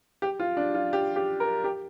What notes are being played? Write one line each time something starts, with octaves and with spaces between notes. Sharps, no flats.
G4
F4
D4
F4
G4
G4
A#4
G4